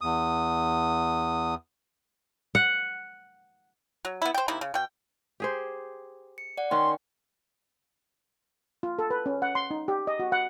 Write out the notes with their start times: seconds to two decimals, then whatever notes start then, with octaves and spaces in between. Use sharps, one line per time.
0.01 E2 D#6
2.55 F#5
4.05 F#3
4.22 B3 E4
4.34 C5 G5
4.48 C3 A#3 D#4 E4
4.61 C#3
4.74 B2 G5
5.40 G4 G#4 C5
6.38 C#7
6.57 D5 F#5
6.71 D#3 C#4 F#5 G5 C6
8.83 F4
8.99 A4
9.10 B4
9.26 C#4
9.42 F#5
9.55 C6
9.71 D#4
9.88 G4
10.07 D#5
10.20 F#4
10.32 F#5